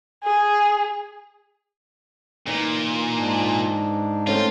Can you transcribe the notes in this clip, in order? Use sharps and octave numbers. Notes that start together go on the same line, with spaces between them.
G#4
A#2 E3 D#4
G#2 D4
A3 C4 C#4 F4